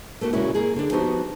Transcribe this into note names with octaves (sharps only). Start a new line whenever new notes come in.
A3 A#3 F#4
A#2 C#3 G#3 C#4 E4 F#4
A#3 G#4
D3 D4
F3 B3 D#4 F#4 G4